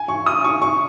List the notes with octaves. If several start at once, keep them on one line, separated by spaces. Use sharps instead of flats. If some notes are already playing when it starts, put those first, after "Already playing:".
Already playing: G#5
C#6
D#6
C#6
C#6